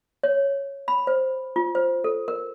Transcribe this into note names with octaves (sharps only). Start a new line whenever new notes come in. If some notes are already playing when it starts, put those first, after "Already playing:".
C#5
B5
C5
F4
C5
A4
A#4